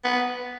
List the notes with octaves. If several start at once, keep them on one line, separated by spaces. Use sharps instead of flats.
B3